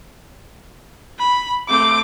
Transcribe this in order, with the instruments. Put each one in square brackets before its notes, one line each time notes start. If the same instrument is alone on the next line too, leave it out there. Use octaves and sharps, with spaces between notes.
[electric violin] B5
[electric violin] A3 C4 [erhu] D6